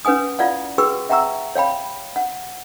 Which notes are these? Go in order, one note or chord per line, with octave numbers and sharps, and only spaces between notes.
C#4 B4 F#5 G#5 D#6
E4 F4 D5 F5 F#5
F#4 G#4 B4 G5 C#6 E6
E5 F#5 G5 A#5 C#6 E6
C#5 F5 G5 B5
F#5